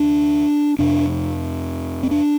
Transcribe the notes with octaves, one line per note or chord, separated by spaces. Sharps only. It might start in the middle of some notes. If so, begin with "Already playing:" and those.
Already playing: D2 C3 D4
F2 C3 D4
C4
D4